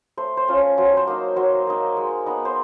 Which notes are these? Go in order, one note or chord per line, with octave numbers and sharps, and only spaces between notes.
A3 C5
C5
C#4 F4
C#5
F#3 C5
C5
A#3 D#4
F#3 C5
A#3 D#4
G#3
B3 D#4
C5